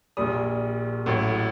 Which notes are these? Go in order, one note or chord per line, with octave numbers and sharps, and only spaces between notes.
A#1 A#2 G3 D#6
A1 A2 F#3